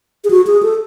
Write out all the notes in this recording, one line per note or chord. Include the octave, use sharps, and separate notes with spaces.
G#4
F#4
G#4
A4